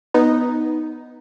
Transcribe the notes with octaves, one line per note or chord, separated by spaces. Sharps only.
B3 D#4